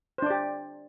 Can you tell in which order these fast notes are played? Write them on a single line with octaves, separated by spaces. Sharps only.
C5 D4 D5 G4